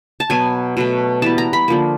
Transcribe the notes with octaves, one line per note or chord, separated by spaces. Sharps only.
A5
B2 F#3 B3 G#5
B2 F#3 A3
E3 G3 B3 A5
A#5
B5
D3 F3 A#3